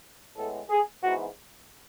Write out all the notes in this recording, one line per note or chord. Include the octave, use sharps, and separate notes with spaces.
A2 G#3 B3 A4
G#4
G#2 E3 B3 F#4